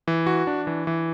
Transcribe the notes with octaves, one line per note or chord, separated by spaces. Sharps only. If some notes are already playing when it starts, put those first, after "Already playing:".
E3
F#4
D4
E3
E3